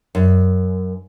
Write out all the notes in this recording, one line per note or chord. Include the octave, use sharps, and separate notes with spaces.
F#2